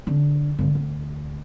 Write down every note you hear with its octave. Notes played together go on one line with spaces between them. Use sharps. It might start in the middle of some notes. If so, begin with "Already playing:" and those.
D3
G2 D3
D2